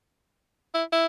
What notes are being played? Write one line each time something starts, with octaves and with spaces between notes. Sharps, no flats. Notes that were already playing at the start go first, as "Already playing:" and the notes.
E4
E4